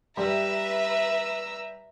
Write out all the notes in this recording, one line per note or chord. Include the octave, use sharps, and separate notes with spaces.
G3 B4 E5 A#5 E6